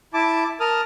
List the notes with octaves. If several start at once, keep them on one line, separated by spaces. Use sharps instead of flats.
E4 A5 D6
A#4 A5 D#6 F6